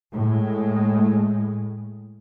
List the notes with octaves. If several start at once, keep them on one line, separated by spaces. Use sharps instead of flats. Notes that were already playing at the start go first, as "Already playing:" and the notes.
A2 G#3